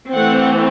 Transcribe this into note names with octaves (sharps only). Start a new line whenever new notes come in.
E3 A3 C4 F#5